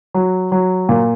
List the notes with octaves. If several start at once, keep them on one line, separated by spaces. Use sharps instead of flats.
F#3
F#3
A#2